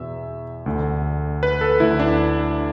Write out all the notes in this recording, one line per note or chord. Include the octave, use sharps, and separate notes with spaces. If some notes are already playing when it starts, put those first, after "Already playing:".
Already playing: E2 B2 E5
D2 D3
B4
A4
D2 D3 E4
D4